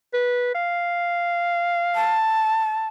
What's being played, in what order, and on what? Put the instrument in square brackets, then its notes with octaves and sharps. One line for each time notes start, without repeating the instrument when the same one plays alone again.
[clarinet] B4
F5
[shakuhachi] A5